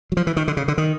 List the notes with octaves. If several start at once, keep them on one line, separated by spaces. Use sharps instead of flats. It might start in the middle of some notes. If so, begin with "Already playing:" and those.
F#3
F3
E3
D#3
D3
C#3
D3
D#3